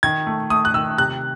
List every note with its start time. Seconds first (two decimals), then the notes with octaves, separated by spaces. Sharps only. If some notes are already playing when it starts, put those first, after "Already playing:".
0.03 D#3 G#6
0.26 A3
0.50 A3 D#6
0.65 F#6
0.74 D#3 E6
0.98 C3 F#6